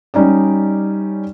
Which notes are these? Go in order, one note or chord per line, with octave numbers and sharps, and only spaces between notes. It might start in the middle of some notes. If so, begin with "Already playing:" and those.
G3 C#4 D#4 D5